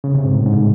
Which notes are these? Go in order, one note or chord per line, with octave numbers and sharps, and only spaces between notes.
C#3
C3
G#2
A2
G#2